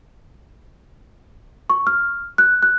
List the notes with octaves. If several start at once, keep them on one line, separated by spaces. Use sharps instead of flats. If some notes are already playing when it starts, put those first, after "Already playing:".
C#6
F6
F#6
F#6